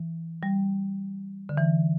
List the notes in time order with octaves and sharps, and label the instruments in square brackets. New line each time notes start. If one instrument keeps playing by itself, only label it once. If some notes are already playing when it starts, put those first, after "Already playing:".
Already playing: [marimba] E3
G3
D3
E3